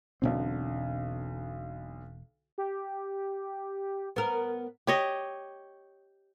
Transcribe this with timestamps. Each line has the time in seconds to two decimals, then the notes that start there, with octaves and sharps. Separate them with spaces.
0.22 E1 B1 B2 D3 C4
2.58 G4
4.16 B3 A#4
4.87 G4 C#5 D#5